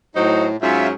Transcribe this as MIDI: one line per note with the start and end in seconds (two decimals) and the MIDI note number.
0.15 0.56 45
0.15 0.46 54
0.15 0.46 63
0.15 0.46 72
0.62 0.92 44
0.62 0.92 54
0.62 0.92 61
0.62 0.88 65
0.62 0.88 76